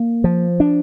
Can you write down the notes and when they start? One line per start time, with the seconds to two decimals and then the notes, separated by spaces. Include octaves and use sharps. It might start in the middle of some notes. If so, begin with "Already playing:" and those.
Already playing: A#3
0.24 F3
0.60 D4